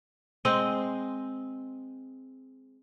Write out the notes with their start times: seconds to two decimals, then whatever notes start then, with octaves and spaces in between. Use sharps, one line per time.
0.45 G#3 C4 D#5